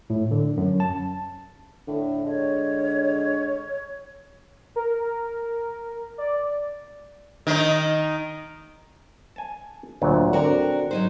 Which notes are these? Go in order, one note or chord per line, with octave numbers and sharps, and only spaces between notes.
A2
D3
F#2
A5
A2 D3
G#3 C#5
A#4
D5
D#3 D#4
G#5 A5
D2 A#2 F#3
D3 C4 F#4 A#4 D5
F#3 D#4 C5